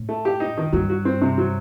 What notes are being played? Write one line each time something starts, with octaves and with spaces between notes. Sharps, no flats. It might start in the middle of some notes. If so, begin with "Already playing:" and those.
Already playing: A2
A3
G4
D#4
D#3
G2 F#3
F#4
C4
C3
F#3